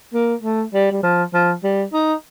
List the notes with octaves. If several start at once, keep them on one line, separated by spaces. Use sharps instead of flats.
A#3
A3
G3
G3
F3
F3
G3
D#4